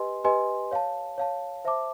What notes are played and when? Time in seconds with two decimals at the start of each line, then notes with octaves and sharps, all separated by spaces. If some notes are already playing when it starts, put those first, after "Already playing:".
Already playing: G4 B4 D#5 G#5 C6
0.24 G4 B4 D#5 G#5 C6
0.71 C#5 F5 A5
1.18 C#5 F5 A5
1.65 C5 E5 A5 D6